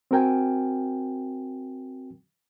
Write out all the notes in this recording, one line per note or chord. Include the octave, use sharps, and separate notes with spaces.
C4 F#4 A#4 G5 G#5